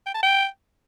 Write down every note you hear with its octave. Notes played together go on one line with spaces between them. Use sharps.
G5
A5
G5